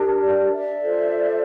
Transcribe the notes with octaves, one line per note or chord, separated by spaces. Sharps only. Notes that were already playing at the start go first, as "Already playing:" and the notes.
Already playing: D4 G4 A#4
D5
D5 E5
F4 A4 C5